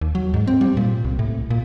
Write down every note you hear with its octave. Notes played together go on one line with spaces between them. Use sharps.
D#2
F#3
G#2
C4
G3
A#2
C2
A2
A#2